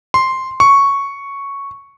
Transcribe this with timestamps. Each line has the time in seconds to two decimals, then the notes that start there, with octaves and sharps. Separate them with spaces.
0.14 C6
0.60 C#6